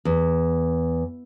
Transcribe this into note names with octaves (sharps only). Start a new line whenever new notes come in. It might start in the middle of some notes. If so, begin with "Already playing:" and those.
E2